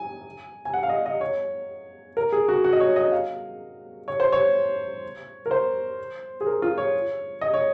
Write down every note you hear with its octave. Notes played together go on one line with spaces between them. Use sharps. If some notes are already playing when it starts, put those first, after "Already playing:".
Already playing: G#5
G#5
F#5
F5
D#5
D#5
C#5
A#4
G#4
F#4
F#4
D#5
C#5
D#5
F5
C#5
C5
C#5
A#4
C5
G#4
A#4
F4
C#5
D#5
C#5